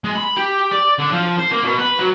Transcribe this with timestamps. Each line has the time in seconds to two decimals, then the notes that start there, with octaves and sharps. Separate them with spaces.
0.04 G#3
0.15 B5
0.37 G4
0.71 D5
0.99 D3
1.12 F3
1.39 C5
1.52 A#3
1.64 B2
1.79 B4
1.99 F#3